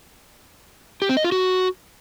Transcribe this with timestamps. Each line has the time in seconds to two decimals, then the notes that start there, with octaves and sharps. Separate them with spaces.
1.02 G4
1.09 C4
1.17 D#5
1.24 F4
1.32 F#4